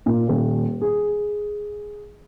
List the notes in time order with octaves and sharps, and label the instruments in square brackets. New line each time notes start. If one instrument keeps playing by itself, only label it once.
[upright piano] A#2
D#1
G#4